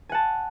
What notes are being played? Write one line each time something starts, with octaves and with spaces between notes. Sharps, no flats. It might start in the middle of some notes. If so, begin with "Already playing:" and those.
F#5 G#5 A5